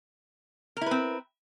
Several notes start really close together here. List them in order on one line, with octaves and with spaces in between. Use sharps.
A#4 E4 B4 C4